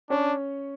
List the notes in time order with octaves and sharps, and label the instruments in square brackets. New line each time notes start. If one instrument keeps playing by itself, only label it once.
[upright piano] C#4 C#5 [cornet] D4